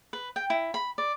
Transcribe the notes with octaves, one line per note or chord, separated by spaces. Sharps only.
B4
G5
E4
B5
D5